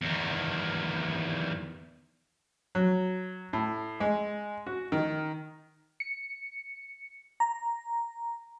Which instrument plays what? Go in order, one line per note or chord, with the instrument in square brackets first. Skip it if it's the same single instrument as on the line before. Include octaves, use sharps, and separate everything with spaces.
[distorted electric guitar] E2 D#3
[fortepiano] F#3
A2
G#3
F#4
D#3
[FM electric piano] C#7
A#5